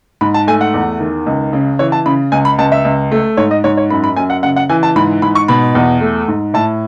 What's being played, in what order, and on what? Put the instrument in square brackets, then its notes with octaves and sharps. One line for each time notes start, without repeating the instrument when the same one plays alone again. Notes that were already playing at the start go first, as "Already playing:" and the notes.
[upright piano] G#2 B5
A5
A3 G#5
F#5
E2
D#3
C#2
C#3
E3 C#5
A5
C#3 B5
C#2 G#5
B5
C#2 A5
E5
C#2
A3
G#2 C#5
D#5
G#2 C#5
C#5
F#2 B5
B5
F#2 G#5
F#5
C#3 F#5
F#5
E3 G#5
A5
G#2 B5
G#2 B5
C#6
B2 B5
E2
A3
G#2
A2 A5